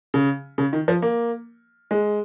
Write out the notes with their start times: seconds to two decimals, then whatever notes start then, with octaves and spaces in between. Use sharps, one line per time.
0.14 C#3
0.58 C#3
0.73 D#3
0.88 F3
1.02 A#3
1.91 G#3